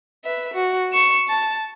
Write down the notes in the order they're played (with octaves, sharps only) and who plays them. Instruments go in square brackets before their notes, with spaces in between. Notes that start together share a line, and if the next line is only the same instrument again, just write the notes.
[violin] B4 E5
F#4
C#6 E7
A5